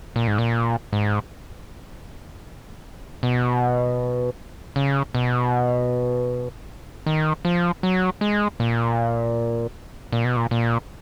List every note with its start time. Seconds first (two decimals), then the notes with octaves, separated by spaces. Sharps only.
0.16 A#2
0.27 G#2
0.38 A#2
0.93 G#2
3.23 B2
4.76 C#3
5.15 B2
7.06 D#3
7.45 F3
7.83 F#3
8.21 G#3
8.60 A#2
10.12 A#2
10.25 B2
10.37 A#2
10.51 A#2